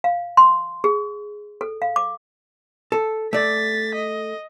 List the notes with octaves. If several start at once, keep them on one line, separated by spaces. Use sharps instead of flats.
F5
C6
G#4
A4
F5
D6
A4
A3 D5 A6 B6
D#5